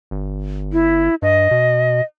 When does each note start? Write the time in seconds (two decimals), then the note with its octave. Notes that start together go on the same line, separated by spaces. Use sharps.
0.11 G1
0.72 E4
1.22 G2 D#5
1.51 B2